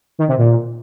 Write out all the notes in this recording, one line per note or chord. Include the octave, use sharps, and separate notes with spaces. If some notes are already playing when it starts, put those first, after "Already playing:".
D#3
C3
A#2